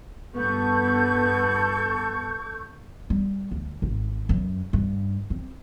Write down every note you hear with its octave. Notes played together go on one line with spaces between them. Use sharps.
G2 B3 A4 C#6 G6
G3
D2
G#1
F#2
G2
C4